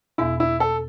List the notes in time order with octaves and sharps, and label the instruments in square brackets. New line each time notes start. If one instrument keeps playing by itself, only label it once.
[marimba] E2 B2 B3 [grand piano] E4
[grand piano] E4
A4